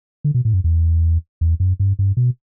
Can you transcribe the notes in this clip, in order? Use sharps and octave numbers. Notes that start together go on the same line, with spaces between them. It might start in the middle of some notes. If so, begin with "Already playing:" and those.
D3
B2
A2
F#2
E2
E2
F#2
G2
G2
B2